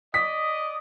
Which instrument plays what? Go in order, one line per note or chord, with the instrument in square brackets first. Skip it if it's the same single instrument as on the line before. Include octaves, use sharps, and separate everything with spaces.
[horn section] D5 D#5 [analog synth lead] D#6 [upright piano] B6